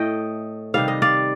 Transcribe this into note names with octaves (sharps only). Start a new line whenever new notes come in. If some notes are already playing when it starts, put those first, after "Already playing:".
Already playing: A2 A3 D#5 G5
C3 D#3 G3 F5
D#5
D5 F5